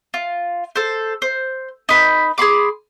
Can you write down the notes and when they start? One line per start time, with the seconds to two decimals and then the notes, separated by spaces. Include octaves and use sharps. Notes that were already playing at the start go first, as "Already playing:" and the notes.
0.14 F4
0.76 A4 C5
1.22 C5
1.89 D#4 B4 B5
2.38 G#4 B5 C6 D6